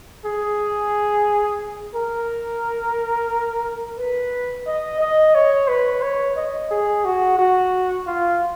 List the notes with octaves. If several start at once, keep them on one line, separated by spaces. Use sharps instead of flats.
G#4
A#4
B4
D#5
D#5
C#5
B4
C#5
D#5
G#4
F#4
F#4
F4